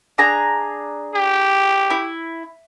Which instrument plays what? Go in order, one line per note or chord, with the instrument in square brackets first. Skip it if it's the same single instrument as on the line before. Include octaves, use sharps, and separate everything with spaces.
[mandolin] D4 G#4 A#5
[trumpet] G4
[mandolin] E4